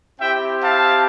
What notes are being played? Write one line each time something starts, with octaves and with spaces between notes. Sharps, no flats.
C4 E4 G4 E5 G5
F5 A5